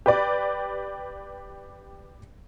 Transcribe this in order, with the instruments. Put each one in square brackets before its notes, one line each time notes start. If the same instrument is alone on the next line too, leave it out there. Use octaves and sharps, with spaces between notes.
[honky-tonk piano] G4 B4 D5